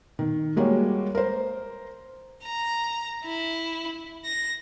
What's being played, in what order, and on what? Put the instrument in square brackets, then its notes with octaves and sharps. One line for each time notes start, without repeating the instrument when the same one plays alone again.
[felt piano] D#3
G3 G#3 A#3 F#4 C#5
A#4 C5
[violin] A#5
E4
A#6